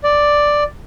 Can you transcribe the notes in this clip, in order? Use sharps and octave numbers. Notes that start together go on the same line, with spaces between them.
D5